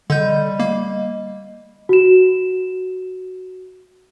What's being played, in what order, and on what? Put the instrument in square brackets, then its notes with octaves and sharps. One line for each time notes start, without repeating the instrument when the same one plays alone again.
[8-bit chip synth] D3 G6 [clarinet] G3 [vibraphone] D#5
[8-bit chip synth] A#3
[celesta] F#4 E7